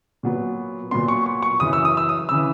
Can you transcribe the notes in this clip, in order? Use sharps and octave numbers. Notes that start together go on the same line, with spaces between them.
A#2 F#3 B3
A#2 F#3 B3 C6
C#6
C#6
C#6
F#2 C#3 E3 D#6
E6
D#6
E6
D#6
C#3 E3 E6